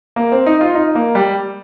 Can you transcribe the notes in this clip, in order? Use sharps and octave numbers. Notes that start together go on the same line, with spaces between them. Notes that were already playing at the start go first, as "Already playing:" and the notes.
A#3
C4
D#4
F4
D#4
A#3
G3